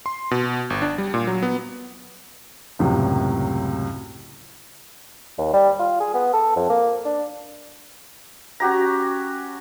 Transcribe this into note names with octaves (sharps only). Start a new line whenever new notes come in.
C6
B2
G1
D4
G3
A#2
F#3
B3
C#2 F#2 A2 C3
D#2
G3
F4
G#4
B3
A4
F2
A#3
D4
C#4 F#4 G4 A#5